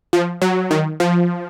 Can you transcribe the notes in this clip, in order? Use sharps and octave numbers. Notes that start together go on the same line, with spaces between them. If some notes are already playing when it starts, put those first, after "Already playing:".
F3
F#3
D#3
F3